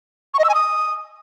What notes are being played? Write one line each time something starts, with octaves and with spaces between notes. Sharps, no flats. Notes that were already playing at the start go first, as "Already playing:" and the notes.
C#6
D#5
E6
G#5
D#6